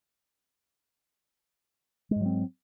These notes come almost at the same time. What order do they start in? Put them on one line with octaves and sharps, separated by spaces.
G#3 G#2 F#3 C4